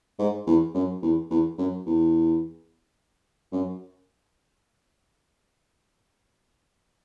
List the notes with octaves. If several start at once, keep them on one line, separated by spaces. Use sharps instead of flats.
G#2
E2
F#2
E2
E2
F#2
E2
F#2